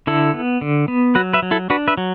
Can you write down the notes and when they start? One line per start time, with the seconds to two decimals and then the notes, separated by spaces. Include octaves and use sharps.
0.07 D3 E4 A4
0.34 B3
0.61 D3
0.88 B3
1.15 F#3 F#4 B4
1.33 B4 E5
1.42 F#3
1.51 E4 A4
1.70 D4 F#4 B4
1.88 B4 E5
1.97 F#3